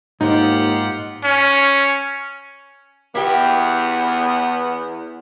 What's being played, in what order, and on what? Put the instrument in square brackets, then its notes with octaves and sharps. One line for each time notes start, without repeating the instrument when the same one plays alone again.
[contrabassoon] D#2 [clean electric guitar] G#2 [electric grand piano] D#4 [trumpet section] F4 G4 F#5
[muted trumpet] C#4
[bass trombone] E2 [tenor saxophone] B3 [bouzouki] E4 G4